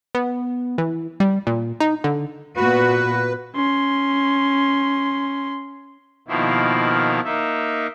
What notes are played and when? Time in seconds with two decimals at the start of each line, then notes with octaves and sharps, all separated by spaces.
0.15 B3
0.78 E3
1.20 G3
1.47 A#2
1.80 D#4
2.04 D3
2.57 A#2 B3 F#4 B4
3.55 C#4 C6
6.28 B2 D#3 F3 A#3 E4
7.25 A#3 D#4 E5